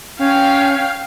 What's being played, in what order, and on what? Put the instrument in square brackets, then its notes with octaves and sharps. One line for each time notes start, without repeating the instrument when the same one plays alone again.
[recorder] C#4 [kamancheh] F5 G5